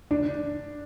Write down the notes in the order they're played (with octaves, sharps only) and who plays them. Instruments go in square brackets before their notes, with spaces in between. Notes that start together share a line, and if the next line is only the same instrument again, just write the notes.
[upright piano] D4